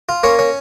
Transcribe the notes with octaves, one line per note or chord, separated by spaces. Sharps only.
F4
A#3 C#4 C#5
C#4